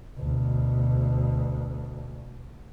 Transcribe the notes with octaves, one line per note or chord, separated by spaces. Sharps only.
D2 B2